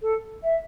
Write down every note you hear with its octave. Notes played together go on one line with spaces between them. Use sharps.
A4
E5